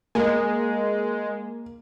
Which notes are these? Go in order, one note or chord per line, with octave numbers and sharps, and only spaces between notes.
G#3 A#3